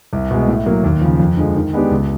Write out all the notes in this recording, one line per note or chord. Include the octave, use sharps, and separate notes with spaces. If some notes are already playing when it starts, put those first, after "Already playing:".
C2
B2 G#3
A2
F#3 A#3
D#2
C#3 F3
F2
D3 F3 G#3
D#3
G#3 B3 D4 G4
C#2